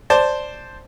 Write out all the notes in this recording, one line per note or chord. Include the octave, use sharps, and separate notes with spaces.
C5 D5 A5